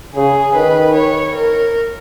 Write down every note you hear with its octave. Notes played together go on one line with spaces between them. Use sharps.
C#3 G#4
D#3 B4
C#5
A#4